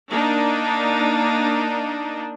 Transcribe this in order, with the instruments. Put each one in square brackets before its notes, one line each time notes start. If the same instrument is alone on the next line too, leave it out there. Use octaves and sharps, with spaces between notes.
[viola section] A#3 D4 D#4